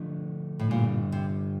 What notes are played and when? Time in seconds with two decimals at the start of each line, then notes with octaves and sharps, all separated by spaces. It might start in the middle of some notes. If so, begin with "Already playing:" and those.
Already playing: D3 F3 A3 D4
0.59 A2
0.70 G2 A#2 D3 G3
1.12 C3